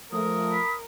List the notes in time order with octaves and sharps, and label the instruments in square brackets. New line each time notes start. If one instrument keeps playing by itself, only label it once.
[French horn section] F3 A3 [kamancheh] A#4 [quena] D#6
[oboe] B5